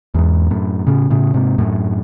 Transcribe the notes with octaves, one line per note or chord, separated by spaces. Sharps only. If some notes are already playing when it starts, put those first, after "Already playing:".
E2 G#2
F#2 A2
A2 C#3
A2 C#3
G#2 C3
F#2 A2